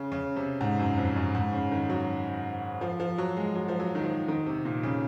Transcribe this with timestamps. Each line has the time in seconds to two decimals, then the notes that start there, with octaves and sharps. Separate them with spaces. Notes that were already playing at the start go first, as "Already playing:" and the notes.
Already playing: C#3
0.12 C#3
0.36 C3
0.61 G#2
0.79 F#2
0.97 F2
1.16 F#2
1.35 G#2
1.53 C#3
1.72 D#3
1.90 F#3
2.81 F3
3.00 F3
3.18 F#3
3.37 G#3
3.55 F#3
3.68 F3
3.80 F#3
3.95 D#3
4.04 F3
4.28 D#3
4.46 C3
4.65 A#2
4.83 C#3